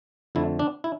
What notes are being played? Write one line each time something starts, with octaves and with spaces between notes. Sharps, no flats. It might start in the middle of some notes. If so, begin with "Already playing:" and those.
F2 D3 A3 E4
D4
E4